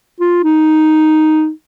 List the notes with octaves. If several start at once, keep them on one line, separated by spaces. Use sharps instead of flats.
F4
D#4